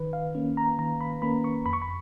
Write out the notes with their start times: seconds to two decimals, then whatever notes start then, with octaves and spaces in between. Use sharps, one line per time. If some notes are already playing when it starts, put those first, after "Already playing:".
Already playing: D#3 B4
0.13 F5
0.35 A#3 C#4
0.57 A#5
0.79 D#3 A#5
1.01 B5
1.22 A#3 C#4 B5
1.44 C#6
1.66 F2 B5
1.73 C#6
1.82 B5